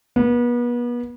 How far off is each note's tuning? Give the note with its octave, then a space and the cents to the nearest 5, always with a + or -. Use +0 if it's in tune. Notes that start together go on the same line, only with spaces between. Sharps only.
B3 -35